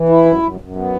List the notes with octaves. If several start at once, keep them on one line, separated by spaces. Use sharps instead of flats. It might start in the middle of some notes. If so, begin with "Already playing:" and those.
Already playing: E3
E4
F#2
F#2
F#2
B3